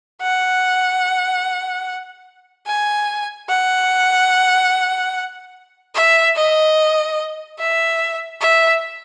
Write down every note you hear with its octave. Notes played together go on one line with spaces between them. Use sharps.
F#5
G#5
F#5
E5
D#5
E5
E5